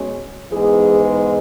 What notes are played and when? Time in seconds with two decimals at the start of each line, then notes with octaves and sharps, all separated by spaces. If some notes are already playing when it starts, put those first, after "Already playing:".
Already playing: B2 G#3 C#4
0.51 G#2 E3 G#3 B3 G#4